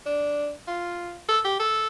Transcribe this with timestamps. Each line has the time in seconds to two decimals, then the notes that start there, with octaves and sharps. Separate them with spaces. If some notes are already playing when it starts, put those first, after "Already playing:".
0.06 D4
0.67 F4
1.29 A4
1.44 G4
1.60 A4